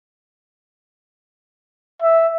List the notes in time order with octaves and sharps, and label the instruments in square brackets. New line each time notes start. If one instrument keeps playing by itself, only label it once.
[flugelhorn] E5